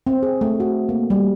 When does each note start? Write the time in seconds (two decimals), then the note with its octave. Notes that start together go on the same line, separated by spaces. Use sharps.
0.07 C4
0.23 G#4
0.41 A3
0.60 F#4
0.89 A#3
1.10 G3